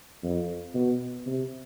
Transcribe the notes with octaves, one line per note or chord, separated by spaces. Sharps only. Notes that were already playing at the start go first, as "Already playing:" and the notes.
F2
B2
C3